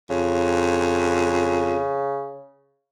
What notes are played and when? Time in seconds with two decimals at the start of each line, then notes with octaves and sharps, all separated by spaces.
0.10 F2 C#3